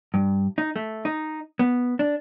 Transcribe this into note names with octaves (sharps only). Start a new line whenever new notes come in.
G2
D#4
A3
D#4
B3
D4